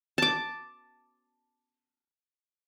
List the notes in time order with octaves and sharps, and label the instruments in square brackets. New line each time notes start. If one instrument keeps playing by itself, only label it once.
[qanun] A5 D6